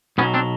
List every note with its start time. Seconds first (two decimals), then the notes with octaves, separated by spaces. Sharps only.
0.18 B1 B2 F#3 B3 C#4
0.34 C4 D4